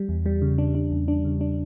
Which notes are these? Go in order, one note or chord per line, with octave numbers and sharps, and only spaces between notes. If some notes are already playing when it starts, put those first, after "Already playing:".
Already playing: G3
E2
G3
C#3
D4
D4
E2
D4
C#3
D4